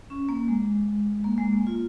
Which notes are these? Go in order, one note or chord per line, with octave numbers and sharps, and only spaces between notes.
C#4
A#3
G#3
A#3
G#3
A#3
F4